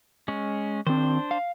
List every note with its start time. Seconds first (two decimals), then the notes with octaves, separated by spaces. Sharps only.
0.28 G#3 C#4
0.87 D#3 C4 D4 C5
1.31 F5